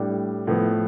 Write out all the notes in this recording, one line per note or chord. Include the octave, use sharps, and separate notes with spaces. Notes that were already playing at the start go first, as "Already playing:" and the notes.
Already playing: A2 G3 D4
A2 F3 B3